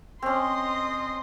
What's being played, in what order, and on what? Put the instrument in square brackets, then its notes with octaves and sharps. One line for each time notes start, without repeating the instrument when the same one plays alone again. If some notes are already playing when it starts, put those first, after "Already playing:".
[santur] C4 C#4 [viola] D#5 C6